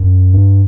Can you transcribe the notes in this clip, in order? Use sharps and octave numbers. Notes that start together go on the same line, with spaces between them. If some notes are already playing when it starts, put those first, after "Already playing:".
Already playing: F#2
G2